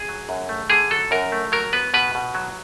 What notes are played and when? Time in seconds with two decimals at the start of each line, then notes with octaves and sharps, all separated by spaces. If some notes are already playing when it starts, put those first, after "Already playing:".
Already playing: G#4
0.09 F#3
0.29 F#2
0.49 A3
0.70 D3 G#4
0.90 F#3 A4
1.11 F#2 A#4
1.32 A3
1.52 F#3 A#4
1.73 B3 B4
1.94 B2 B4
2.15 B2
2.35 F#3